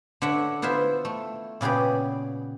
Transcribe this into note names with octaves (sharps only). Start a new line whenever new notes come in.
D3 C#5 E5 F#5
B3 E4 F4 C5 E5
A3
A#2 C#3 B3 G4 G#4